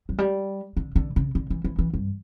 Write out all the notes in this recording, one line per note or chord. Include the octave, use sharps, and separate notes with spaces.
F#3
G3
D3
D3
C#3
D3
E3
E3
E3
G2